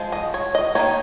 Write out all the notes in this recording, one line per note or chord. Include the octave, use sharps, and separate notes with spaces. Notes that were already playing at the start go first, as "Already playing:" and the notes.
Already playing: F3 G#3
D#5
C#5
D#5
D#3 A#3 D#4 C#5